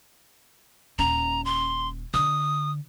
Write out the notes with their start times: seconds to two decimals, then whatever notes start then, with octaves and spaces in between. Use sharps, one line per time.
0.99 D#1 C#4 A#5
1.45 C6
2.14 D3 D#6